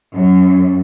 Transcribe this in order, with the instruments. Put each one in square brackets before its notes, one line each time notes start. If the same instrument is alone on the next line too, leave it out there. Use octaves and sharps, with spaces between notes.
[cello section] F#2